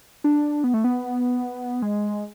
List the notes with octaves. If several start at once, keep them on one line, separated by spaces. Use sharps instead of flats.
D4
B3
A3
B3
G#3